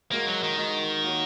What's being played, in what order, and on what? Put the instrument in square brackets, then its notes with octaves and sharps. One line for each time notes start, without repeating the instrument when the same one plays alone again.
[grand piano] G#3 F#4 A#4 D#5 [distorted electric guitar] A#3
[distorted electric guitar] F#3
D#3
[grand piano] G#3 F#4 A#4 D#5
A#3 F#4 C#5